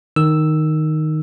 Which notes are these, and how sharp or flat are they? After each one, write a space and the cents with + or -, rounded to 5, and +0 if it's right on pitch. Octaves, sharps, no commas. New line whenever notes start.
D#3 -5 E6 +0